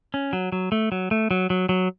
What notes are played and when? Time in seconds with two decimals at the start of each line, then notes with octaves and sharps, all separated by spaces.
0.14 C#4
0.33 F#3
0.52 F#3
0.72 A3
0.92 F#3
1.11 A3
1.31 F#3
1.50 F#3
1.69 F#3